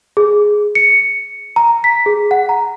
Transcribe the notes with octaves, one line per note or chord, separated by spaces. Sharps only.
G#4
C#7
A#5
B6
G#4
F#5
A#5